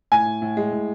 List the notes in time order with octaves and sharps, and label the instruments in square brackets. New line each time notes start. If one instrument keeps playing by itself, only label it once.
[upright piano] A2 [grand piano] G#5
[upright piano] A2
A2
G#3
A2